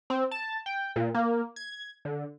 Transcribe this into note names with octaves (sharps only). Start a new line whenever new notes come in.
C4
A5
G5
A#2
A#3
G#6
D3